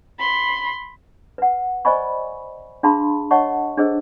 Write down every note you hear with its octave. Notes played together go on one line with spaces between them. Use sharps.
B5 C6
B4 F#5
C5 D5 D#5 G#5 B5 C#6
D4 G#4 F5 A5 B5 C6
C#5 D#5 F#5 A5 C#6
D4 G#4 A4 C5 D#5 E6